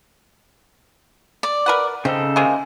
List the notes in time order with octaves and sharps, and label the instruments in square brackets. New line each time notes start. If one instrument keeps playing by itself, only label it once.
[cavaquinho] D5
[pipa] A#4 B4 F#5
[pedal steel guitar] C#3 A4 [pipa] C4 [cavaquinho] D#4
[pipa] C3 G#3 A#3